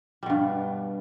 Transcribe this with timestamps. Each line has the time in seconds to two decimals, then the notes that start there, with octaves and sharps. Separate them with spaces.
0.23 G3
0.26 B2
0.30 G2